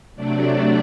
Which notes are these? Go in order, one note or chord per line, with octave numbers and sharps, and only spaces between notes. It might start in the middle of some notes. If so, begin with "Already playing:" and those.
C3 F#3 A3 D4 D5